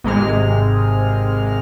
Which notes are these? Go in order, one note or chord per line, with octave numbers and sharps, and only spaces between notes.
G#1 C3 G#3 F6